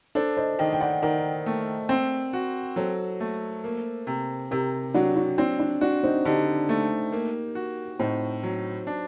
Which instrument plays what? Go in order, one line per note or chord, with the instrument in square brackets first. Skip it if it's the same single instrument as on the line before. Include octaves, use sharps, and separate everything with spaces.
[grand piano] D4 [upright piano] A4 C5
[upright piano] C5 D#5
[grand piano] D#3 [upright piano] D#5 G5
[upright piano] G5
D5 F#5
[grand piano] D#3 [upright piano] A#4 D5
[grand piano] A3
C4
F#4
[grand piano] F#3 [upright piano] A4 C5
[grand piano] A3
A#3
C3
[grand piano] C3 [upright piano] G4 A#4
[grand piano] F#3 [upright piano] D4 F#4
[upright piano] D4 F#4
[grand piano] C4 [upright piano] D4
[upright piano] D4
[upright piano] D4 [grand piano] F#4
[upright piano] C4 D#4
[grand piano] D3 [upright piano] D#4 G4
[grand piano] A3
A#3
F#4
[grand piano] A2 [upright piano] C4 D#4
[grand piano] F#3
D4